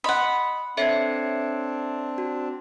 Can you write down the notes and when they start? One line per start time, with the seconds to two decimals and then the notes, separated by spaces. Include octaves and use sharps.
0.04 D#5 F#5 B5 C6 D#6
0.77 C4 D4 A4 C#5 E5 G#6 C7 C#7
2.18 F#4